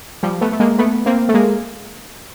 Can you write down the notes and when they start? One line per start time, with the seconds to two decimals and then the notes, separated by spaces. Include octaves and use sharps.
0.23 F3 G3
0.41 A3 B3
0.52 A3
0.60 G#3 A#3
0.78 A3 B3
1.06 A#3 C4
1.29 A3
1.34 G#3 A#3